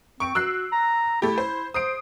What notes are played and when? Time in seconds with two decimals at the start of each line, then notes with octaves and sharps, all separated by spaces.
0.20 C4 C#6 D7
0.35 F#4 E6 F#6 C7
0.72 A#5
1.22 A3 E4 G4
1.38 C5
1.74 C5 D#6 C7 D7